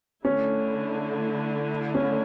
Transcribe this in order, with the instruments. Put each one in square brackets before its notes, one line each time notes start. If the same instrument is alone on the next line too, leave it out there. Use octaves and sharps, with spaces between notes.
[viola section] D3 A3 E4 [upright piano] C#4
[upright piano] C#4